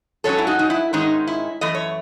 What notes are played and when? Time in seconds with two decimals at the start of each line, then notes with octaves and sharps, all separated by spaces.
0.24 G#2 F#3 C#4 A4 C#5
0.38 E4
0.47 D#4 F#4
0.59 D#4
0.70 E4
0.93 G#2 D#3 G#3 C#4 D#4
1.27 E4
1.61 F#2 E3 A3 D#5
1.75 C#5